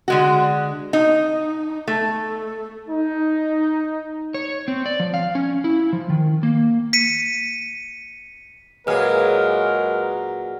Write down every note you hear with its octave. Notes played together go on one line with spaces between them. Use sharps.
D3 G#3 F#4
D#4
A3
D#4
C#5
C4
D5
F3
F5
C#4
E4
F3
D#3
A#3
B6 C#7 D#7
A#2 F#3 G#3 G#4 A#4 B4 F6